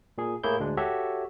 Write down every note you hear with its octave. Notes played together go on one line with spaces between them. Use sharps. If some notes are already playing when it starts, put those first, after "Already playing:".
A#2 G#4
A2 A3 A#3 E4 G#4 G6
D2 G#3 D4
F#4 G4 A4 C#5 E5